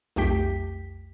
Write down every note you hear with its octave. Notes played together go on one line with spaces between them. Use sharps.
B1 F2 A3 G4 G5 B6